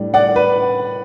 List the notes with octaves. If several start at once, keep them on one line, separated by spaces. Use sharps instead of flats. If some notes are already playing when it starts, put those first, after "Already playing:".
Already playing: A2 G3 D4
D5 F#5
B4